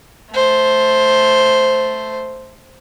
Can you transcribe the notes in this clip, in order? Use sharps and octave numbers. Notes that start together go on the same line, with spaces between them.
A3 C5